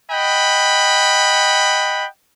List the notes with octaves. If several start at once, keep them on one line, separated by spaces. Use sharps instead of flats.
D#5 F#5 G5 B5